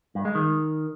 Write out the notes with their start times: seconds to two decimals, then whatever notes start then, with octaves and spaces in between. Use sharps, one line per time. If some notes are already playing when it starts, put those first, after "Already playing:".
0.15 G2
0.25 G#3
0.35 D#3